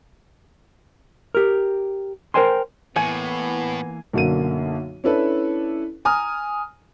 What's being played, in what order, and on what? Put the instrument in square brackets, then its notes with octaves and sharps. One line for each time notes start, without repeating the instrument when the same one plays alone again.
[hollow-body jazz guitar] G4 A#4
A#4 C5 G5 G#5 C6
[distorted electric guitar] A2 [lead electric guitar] E3 A#3 [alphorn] B3 [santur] G#5
[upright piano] B1 F#2 D3 A#3 D#7
C#4 D4 E4 A4 B4
G#5 A#5 D#6 F6